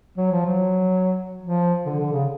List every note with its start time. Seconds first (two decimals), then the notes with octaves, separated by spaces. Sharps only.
0.17 F#3
0.32 F3
0.46 F#3
1.43 F3
1.86 D3
1.99 D3
2.13 C#3